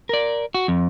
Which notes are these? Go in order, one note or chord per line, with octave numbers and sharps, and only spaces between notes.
A#4 D5
F#4
F2